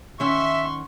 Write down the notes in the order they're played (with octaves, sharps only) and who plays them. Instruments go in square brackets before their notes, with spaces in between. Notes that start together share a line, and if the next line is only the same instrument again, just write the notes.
[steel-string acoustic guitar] D#3 C#4 F#5 [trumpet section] E5 [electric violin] C6 C#6